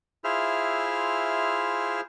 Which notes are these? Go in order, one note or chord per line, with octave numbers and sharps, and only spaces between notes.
E4 F4 G#4 C5 E5 F6